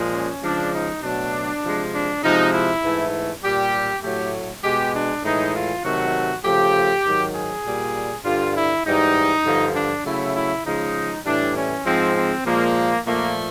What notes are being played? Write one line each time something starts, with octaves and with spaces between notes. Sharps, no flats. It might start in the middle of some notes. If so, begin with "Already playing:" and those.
Already playing: A#2 F3 G#3
C#4
C#3 F3 G#3 D4
D#4
B2 F#3 A3 D4
C3 F3 G#3
D4
C3 F3 G#3 D#4
E4
G#2 E3 A3
A#2 G3 G4
A2 F#3 A3 G4
B2 G#3 G4
D4
A2 E3 G#3 D#4
F4
C3 D#3 F#3 A3 F#4
C#3 F3 A3 G4
G#2 D#3 F#3
G#4
A#2 G3
G2 D3 G3 F4
E4
G#2 E3 G3 D#4
G2 D3 F3
D4
C#3 F#3 A3 E4
E4
C#3 F3 G#3 D#4
A2 E3 G3 D4
C#4
G#2 F3 G#3 C4
C4
A#2 F3 G#3 A#3
A#2 F3 A3 A#3